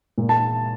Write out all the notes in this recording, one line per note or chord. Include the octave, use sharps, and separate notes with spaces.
A#2
A5